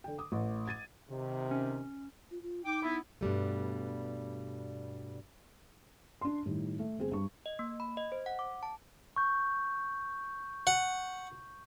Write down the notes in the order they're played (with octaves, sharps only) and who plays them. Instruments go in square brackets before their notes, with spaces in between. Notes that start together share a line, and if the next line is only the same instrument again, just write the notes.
[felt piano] D3 G5
D6 D#6
A1
G#6 A6 D#7
[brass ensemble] C3 D#3
[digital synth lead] C#4
[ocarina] F4
F4
[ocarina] D#4 [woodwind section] G5 D6
[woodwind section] B3 E4
[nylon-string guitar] G2 B2 G3 A3
[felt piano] D4 C6
A2 D#3 G3
A3
G1 C4 G#4
G2 C#6
[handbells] D#5
A#3
B5
D#5
C5
F#5
D6
A5
[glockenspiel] C#6 G6
[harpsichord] F#5